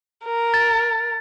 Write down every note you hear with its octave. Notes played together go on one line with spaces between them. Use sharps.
A#4
A6